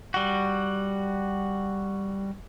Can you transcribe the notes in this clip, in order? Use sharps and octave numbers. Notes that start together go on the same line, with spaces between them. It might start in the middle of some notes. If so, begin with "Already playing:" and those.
G3 F#4